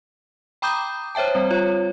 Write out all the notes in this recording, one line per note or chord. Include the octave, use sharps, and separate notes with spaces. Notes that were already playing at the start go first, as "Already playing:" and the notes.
G5 A#5 B5 D6 D#6 G6
C5 C#5 E5 G5 A5
G3 C4
F4 C#5